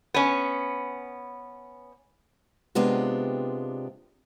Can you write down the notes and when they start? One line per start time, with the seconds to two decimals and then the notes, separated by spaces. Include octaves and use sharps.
0.14 B3 C#4
2.75 C3 G#3 B3 D4 F4 G4